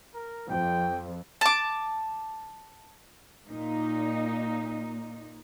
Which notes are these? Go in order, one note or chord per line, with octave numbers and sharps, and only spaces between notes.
A#4
F2 G5
A5 D6
A#2 D#4